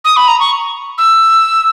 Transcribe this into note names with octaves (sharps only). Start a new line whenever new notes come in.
D#6
B5
A#5
C#6
E6